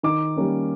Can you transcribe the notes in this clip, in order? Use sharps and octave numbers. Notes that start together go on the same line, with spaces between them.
D#3 D6
G3 A#3 C#4